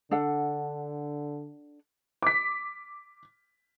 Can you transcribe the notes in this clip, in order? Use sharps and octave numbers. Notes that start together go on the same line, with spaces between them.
D3 D4 A4 F#5
D6 B6